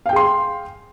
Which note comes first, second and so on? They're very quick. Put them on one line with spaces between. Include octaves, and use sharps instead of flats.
F5 G5 G#4 C6